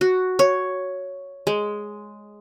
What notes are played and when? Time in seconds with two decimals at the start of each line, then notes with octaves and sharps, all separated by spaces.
0.01 F#4
0.39 C#5
1.47 G#3